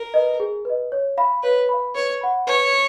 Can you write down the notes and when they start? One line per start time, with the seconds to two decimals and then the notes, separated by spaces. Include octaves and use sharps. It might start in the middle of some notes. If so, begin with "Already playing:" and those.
Already playing: A#4
0.14 B4 D#5
0.40 G#4
0.65 B4 D#5
0.92 C#5
1.18 F5 B5
1.43 B4 C#5
1.69 F5 B5
1.95 B4 C#5
2.21 F#5 B5
2.47 B4 C#5